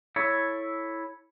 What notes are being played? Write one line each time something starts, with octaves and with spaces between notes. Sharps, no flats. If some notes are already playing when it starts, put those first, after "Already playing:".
E4 A4 C#5